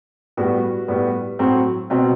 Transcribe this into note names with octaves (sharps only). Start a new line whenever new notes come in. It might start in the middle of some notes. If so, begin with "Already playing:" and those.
A2 G3 B3 F#4
A2 G3 B3
A2 F#3 C4
B2 F#3 C4